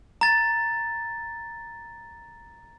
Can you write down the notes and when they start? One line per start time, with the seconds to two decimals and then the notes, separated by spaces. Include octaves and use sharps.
0.21 A#5 A6